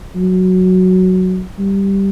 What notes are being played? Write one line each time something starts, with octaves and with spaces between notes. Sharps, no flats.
F#3
G3